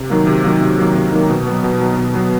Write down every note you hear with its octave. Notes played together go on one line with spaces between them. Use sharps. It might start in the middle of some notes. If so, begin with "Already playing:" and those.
Already playing: C3
D#3 F#3 A#3
C3
D#3 F#3 A#3
C3
D#3 F#3 A#3
C3
D#3 F#3 A#3
B2
F#3 B3
B2
F#3 B3
B2
F#3 B3